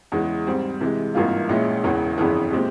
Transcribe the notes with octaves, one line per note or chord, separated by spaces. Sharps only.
E2 C#3 E3 G#3
G#2 G3 C4
C3 E3 G#3
G#1 G2 E3 A#3 F4
A#1 A#2 G#3 C#4 E4
E1 E2 C#3 E3
G1 F2 C#3 E3
A#2 G#3 C4 G4